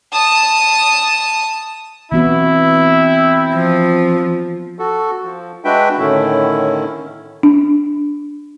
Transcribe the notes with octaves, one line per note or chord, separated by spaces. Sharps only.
A5 D#6
E3 B3 C4 E4 F#4
F3
F#4 A4
F3
G#3 D4 F#4 B4 E5 G5
A2 D3 D#3 C#4 E4
D4